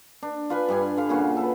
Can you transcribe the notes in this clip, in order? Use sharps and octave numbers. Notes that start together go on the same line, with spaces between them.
D4
F4 B4 G#5
G2 G3 G#5
D3 F5
A#2 C#3 F4 F#4
A4 B4